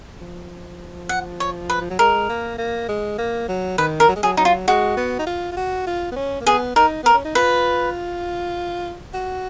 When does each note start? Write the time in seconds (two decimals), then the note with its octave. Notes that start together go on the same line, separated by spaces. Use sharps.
0.21 F3
1.09 F#5
1.40 C#5
1.70 B4
1.81 F3
1.90 F#3
1.99 G#3 A#4
2.30 A#3
2.58 A#3
2.89 G#3
3.18 A#3
3.48 F#3
3.78 D#3 B4
4.00 A#4
4.08 F#3
4.16 G#3
4.23 F#3 G#4
4.37 F#3 D#4
4.45 F4
4.68 G#3 F#4
4.97 B3
5.19 D#4
5.27 F4
5.52 F4
5.57 F#4
5.87 F4
6.12 B3
6.16 C#4
6.41 A#3
6.46 B3 G#4
6.76 D#4 A#4
7.03 B3 A#4
7.13 C#4
7.25 D#4
7.35 F4 B4
9.14 F#4